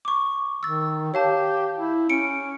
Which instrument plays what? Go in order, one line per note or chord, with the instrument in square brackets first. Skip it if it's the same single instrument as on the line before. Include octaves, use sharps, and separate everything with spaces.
[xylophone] C#6 D6
[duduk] D#3 [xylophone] E6 A6
[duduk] G4 [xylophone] C#5 F5 A5
[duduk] E4
[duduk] C#4 [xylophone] C#7 D7